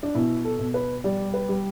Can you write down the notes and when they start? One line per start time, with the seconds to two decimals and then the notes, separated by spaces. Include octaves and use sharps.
0.03 D4
0.14 B2 E4
0.45 A4
0.59 B2
0.74 B4
1.04 G3 D5
1.34 B4
1.49 G3